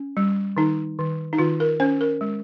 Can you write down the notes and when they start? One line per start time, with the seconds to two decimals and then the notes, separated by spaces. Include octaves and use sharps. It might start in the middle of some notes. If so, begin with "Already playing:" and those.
Already playing: C#4
0.17 G3
0.57 D#3 D#4
0.99 D#3
1.33 D#4
1.38 D#3 F4
1.60 A#4
1.80 C#4 C5
2.01 A#4
2.21 G#3